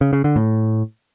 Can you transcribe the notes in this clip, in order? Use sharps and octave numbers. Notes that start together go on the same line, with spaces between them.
C#3
C#3
D3
A2